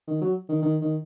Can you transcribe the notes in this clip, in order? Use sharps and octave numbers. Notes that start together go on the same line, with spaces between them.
D#3
F#3
D#3
D#3
D#3